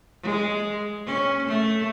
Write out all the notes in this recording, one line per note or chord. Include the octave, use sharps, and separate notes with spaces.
G#3
C#4
A3